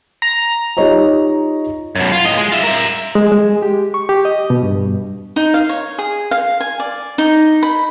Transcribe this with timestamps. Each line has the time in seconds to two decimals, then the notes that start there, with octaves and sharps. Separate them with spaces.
0.22 A#5
0.77 D#4 F4 G4 C#5 D#5 A#5
1.95 F#2 B2
2.12 F4
2.25 A2 D#5
2.37 G#3
2.52 F4 E5
2.64 A#4 E5
3.15 G#3
3.32 G#3
3.62 G4
3.94 C#6
4.09 G4
4.25 D#5
4.50 B2
4.63 G2
5.36 D#4
5.54 F5
5.69 C#5
5.98 G#4
6.31 F5
6.60 G#5
6.80 D5
7.18 D#4
7.63 B5